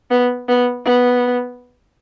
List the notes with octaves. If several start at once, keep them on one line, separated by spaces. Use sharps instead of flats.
B3
B3
B3